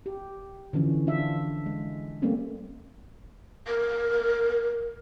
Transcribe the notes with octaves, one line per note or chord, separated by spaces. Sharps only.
G4
D3 E3 F3 C#4
D4 F4 E5
G#3
G3 A3 A#3 C4 C#4 G4
A#4